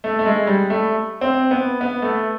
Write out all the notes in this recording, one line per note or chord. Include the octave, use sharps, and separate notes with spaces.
A3
A3
G#3
G3
A3
C4
B3
B3
A3